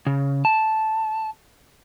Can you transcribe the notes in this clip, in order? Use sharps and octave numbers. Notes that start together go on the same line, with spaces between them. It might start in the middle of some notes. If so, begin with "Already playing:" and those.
C#3
A5